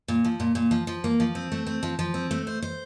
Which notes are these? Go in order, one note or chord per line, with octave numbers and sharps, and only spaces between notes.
A#2
F3
A#2
A#2
F3
F3
A#3
F3
C4
A3
C4
F3
F3
C4
A3
C5
C5